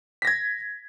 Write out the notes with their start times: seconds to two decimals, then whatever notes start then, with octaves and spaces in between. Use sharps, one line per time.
0.22 B6
0.25 A#6
0.27 G#6